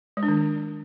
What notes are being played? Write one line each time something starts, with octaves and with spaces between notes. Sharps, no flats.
G#3
D4
D#3